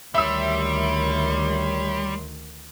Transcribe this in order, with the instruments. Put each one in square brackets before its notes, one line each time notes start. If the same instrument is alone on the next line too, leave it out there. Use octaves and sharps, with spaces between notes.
[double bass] D2 D#3 [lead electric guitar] G3 [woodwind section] C#5 C6 [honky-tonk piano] E5 E6